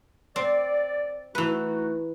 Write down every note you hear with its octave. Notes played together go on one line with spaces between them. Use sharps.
C4 D5
E3 A3 D#4 F#4 B4